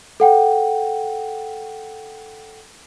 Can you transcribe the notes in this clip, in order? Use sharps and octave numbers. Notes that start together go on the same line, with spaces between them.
A4 F#5 G5